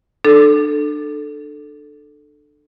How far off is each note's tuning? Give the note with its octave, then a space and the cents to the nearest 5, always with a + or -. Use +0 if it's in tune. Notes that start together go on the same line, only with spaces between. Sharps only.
D4 +30 A4 +0